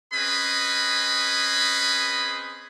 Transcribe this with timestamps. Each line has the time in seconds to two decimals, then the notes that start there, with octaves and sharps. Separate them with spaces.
0.14 C4 C#4 G#4 B4 D#5 B5